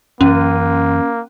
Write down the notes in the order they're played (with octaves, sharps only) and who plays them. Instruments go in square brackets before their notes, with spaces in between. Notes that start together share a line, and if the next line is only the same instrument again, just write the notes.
[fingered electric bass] F#2 E3 [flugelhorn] A#3 [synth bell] C#4